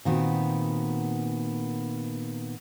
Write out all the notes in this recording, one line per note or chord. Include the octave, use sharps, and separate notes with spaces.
A#2 D#3 B3 C4 F#4